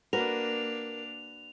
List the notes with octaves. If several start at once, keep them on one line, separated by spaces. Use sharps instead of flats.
A#3 D4 F#4 A#4 B4 F7